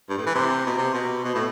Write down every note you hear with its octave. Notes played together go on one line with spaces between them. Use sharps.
G2
A2
E3
C3
B2
C3
B2
B2
A2